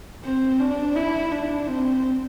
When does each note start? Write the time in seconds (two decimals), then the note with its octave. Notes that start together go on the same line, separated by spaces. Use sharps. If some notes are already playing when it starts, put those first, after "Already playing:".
0.25 C4
0.60 D4
0.96 E4
1.32 D4
1.67 C4